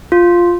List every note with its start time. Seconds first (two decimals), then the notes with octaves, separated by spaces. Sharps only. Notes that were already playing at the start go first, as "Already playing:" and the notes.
0.12 F4